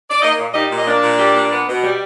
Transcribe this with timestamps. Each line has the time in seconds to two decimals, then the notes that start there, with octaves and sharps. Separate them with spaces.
0.10 D5
0.22 A#3 D#4 D#5
0.38 A#2
0.54 G3 D#4 D#5
0.70 A#2
0.78 D#5
0.86 A#3 D4 D5
1.03 A#2
1.19 G3
1.35 A#2
1.51 B3
1.68 B2
1.83 G3